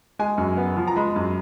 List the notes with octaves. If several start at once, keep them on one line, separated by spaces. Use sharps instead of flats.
G#3 G#5
F#2
B3
F3
A#5
G#3 B5
F#2